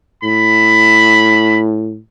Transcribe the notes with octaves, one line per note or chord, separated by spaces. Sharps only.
A2 B5